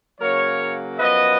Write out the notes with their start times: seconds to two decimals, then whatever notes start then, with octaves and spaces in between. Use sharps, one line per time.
0.20 C#3 F#3 A#3 A#4 C#5
0.98 F#2 F3 B3 B4 D#5